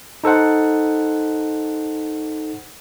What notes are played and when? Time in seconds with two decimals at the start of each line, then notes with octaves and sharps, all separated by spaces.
0.24 D#4 A4 C5 F#5